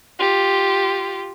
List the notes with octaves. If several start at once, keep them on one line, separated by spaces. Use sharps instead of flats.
F4 G4